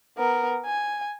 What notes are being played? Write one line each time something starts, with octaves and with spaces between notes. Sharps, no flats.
B3 A#4
G#5